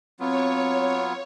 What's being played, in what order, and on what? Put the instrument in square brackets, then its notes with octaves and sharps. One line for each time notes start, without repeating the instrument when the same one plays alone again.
[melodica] F#3 B3 F4 [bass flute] C4 [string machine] C#5